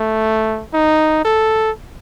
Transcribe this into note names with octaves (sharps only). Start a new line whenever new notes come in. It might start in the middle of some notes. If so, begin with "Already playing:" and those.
Already playing: A3
D#4
A4